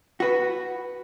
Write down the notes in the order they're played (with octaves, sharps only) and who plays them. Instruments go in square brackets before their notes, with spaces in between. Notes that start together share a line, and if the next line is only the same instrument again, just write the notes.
[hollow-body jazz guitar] F#4 B4